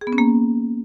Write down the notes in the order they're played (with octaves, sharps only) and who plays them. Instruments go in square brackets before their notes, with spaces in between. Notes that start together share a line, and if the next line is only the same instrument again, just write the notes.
[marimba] G#4
B3
C#4
A#3